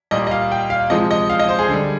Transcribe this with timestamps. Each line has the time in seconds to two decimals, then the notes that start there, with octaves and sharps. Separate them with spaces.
0.11 A#2 G3 D#5
0.27 D#5
0.31 F5
0.52 G5
0.70 F5
0.90 C3 F3 G#3 D#5
1.11 D#5
1.30 F5
1.39 D#5
1.49 C5
1.59 G#4
1.69 D3 G3